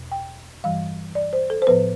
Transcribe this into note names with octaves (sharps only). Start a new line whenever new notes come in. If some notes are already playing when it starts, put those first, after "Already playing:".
Already playing: E2 B2
G5
G2 E3 G3 F5
D5
C5
A4
C5
A2 F3 B3 B4